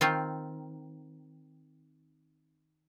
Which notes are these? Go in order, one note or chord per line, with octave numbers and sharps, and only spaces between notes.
D#3 C4 F4